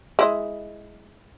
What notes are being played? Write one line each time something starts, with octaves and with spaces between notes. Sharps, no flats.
G#3 E4 D#5